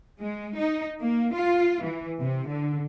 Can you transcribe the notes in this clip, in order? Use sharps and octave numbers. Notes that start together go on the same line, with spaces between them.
G#3
D#4
A#3
F4
E3
C3
D3